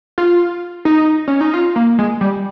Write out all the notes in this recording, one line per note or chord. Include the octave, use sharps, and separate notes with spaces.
F4
D#4
C#4
D#4
F4
A#3
G#3
G3